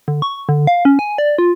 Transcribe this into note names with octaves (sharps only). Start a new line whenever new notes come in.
D3
C#6
D3
F5
C#4
G#5
D5
F4